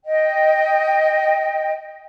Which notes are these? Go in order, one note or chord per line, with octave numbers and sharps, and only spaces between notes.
D#5 G5